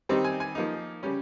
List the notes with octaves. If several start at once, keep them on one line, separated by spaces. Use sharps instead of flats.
D#3 G3 C4 D#4
G#5
G#5
F3 A#3 D#4
C#3 G3 C#4